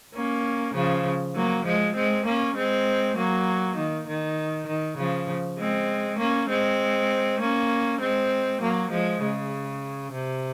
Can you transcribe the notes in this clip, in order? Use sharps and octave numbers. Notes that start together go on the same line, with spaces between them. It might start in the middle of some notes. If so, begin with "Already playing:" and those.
A#3 C#4
C#3 F3
F#3 A#3
F3 G#3
G#3 C4
A#3 C#4
G#3 C4
F#3 A#3
D#3
D#3
D#3
C#3 F3
G#3 C4
A#3 C#4
G#3 C4
A#3 C#4
G#3 C4
F#3 A#3
F3 G#3
C#3
C3